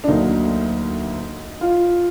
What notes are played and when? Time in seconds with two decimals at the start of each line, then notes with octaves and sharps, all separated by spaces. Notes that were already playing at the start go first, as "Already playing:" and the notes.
0.04 D4
0.07 D2 D3 F#3 A#3 D#4
1.61 F4